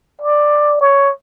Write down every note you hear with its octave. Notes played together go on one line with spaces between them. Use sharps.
D5
C#5